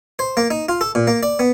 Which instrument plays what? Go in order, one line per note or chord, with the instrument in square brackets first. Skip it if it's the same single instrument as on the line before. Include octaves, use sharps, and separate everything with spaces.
[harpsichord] C5
A#3
D#4
F4
A4
A#2
A#3
D5
B3